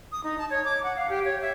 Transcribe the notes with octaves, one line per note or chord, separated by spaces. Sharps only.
D#6
D#4
A5
C#5
D6
F#5
F5
G4
C#5
E5